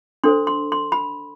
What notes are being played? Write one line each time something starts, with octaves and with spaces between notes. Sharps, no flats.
D4 A4 C5 C6
C6
C6
B5